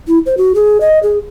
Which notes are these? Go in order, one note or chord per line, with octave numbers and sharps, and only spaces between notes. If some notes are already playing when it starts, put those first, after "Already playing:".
E4
C5
F#4
G#4
D#5
G#4